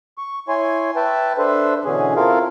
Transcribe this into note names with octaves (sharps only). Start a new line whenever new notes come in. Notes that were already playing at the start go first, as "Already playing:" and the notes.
C#6
E4 C#5 G#5 C6
B4 E5 G5 A5
D4 A4 B4 C5 E5
B2 D3 E3 C#4 G#4
C4 E4 F4 A4 A#4 F5